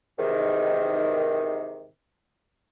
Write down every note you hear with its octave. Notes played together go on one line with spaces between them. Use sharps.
E2 G#2 C3 D#3